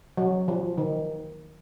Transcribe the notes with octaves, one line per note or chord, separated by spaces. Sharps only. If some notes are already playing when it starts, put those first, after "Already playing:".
F#3
F3
D#3